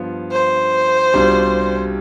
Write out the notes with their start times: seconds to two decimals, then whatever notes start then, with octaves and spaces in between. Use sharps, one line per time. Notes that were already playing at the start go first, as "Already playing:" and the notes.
Already playing: G2 F3 B3 F4
0.32 C5
1.14 C2 B2 G3 D4 F4